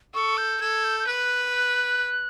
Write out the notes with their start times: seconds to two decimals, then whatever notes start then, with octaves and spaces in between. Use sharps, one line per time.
0.14 A4 C#6
0.37 G6
0.61 A4 G#6
0.84 G6
1.00 G6
1.07 B4 F#6